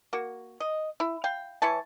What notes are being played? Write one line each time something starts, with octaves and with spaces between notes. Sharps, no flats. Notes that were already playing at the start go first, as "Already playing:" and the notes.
A#3 F#4
D#5
E4
F5 G5
E3 E4 C#5 A5